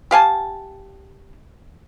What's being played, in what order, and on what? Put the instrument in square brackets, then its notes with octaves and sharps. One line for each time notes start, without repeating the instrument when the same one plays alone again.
[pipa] G4 F5 G#5 A5